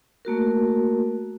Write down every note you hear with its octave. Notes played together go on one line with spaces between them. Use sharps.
A3 A#3 F#4 A#4